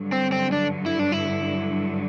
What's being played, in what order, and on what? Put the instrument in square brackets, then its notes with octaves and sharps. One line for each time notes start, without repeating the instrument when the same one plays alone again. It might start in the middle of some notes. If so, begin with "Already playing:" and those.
Already playing: [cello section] G2 D3 F#3
[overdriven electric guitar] C4
C4
D4
E4
D4
E4